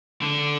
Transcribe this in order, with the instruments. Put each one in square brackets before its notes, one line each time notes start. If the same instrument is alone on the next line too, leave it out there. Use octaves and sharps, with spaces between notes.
[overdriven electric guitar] D3